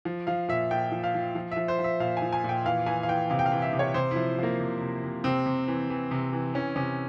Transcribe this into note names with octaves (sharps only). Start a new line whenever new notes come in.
F3
F3 F5
A#2 E5
A#2 G5
F3
F5
F3
F3
F3 E5
C5
F3
E5
A#2 F5
G#5
F3
G#5
A#2
G5
E3 F5
E3 G#5
F5
E3 G5
C3 F5
G5
F5
E3
E5
C3
C#5
C3 C5
F3 E4
F3 A#3
C3
C3
C3
C3 C4
C3
E3
E3
C3
E3
E3 C#4
C3 C#4